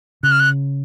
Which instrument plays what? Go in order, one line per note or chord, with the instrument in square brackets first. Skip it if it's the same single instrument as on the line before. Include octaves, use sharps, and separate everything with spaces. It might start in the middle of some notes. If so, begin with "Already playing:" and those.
[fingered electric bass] C#3 [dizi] F#6
[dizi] F6
F#6